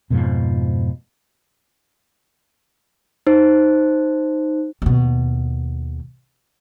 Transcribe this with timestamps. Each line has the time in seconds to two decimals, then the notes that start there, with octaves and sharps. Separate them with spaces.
0.10 F2 G#2 B2 F3
3.27 D#4 C5
4.82 D#2 B2